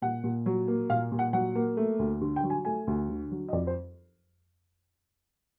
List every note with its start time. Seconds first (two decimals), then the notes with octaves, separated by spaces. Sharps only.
0.02 A#2 F#5
0.24 A#2
0.46 F#3
0.68 A#3
0.90 A#2 F5
1.12 A#2
1.19 F#5
1.33 F#3 F#5
1.55 A#3
1.77 A3
1.99 D2
2.21 D3
2.36 G5
2.43 F#3
2.50 G#5
2.65 A3 G#5
2.87 D2
3.09 D3
3.31 F#3
3.48 D#5
3.53 F2 D5
3.67 C5